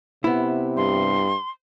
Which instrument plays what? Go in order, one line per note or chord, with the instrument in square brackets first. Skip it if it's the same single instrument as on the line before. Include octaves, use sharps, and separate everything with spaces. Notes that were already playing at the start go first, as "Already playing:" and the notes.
[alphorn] C3 [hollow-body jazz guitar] B3 E4
[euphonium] G2 [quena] C6